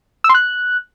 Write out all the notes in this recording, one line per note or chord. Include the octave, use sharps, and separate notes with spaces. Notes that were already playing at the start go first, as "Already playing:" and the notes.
E6
C6
F#6